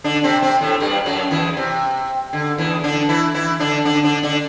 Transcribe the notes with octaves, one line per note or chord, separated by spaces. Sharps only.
D3 D4
C3 C4
C3 C4
A2 A3
G2 G3
F#2 F#3
E2 E3
C3
D3
E2 E3
D3 D4
E3 E4
E3 E4
D3 D4
D3 D4
D3 D4
D3 D4